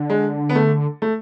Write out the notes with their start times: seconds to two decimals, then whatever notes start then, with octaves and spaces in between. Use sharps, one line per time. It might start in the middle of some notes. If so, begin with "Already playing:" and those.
Already playing: D3
0.10 G#3
0.49 B3
0.55 A3
1.02 A3